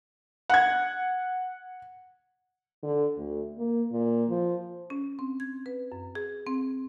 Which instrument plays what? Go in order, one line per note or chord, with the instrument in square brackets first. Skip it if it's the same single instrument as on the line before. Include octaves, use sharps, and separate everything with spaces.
[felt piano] F#5 G#6
[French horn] D3
D2
A#3
A#2
F3
[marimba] C#4
C4
G#6
B4
F#2
G#4
C4